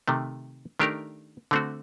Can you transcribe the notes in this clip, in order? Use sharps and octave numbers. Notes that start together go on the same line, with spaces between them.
C3 D#3 A3
D#3 A3 D4 G4 A#4
D3 A3 C4 F#4